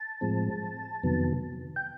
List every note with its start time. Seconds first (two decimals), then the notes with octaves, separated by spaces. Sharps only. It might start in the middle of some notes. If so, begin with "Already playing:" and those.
Already playing: A5
0.21 A2 F3 G#3 C4
1.03 F2 C3 D#3 F#3 B3
1.76 G5